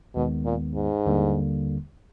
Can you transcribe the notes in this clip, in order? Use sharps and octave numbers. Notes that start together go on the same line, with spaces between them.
D#2 B2 D#3 G#3 B3
A#2
G#2
D#2 D3 G3 A#3